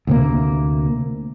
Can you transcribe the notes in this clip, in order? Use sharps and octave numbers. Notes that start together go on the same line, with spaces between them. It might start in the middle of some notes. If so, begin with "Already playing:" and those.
D2 C3 A#3